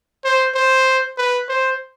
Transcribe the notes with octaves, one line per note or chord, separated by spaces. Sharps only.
C5
C5
B4
C5